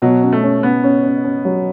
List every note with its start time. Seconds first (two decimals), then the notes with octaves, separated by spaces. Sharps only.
0.02 B2 F#3
0.22 C#4
0.32 A3
0.43 C#4
0.63 B3 C#4
0.84 C#4
1.04 C#4
1.24 C#4
1.45 F#3